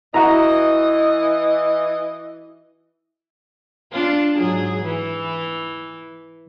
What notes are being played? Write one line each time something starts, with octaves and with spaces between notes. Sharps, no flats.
E3 E4 F#4 D#5 A#5
D4 F4
G#2 F#3 G#4
E3